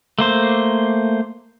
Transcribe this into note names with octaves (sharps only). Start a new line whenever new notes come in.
A3 A#3 C5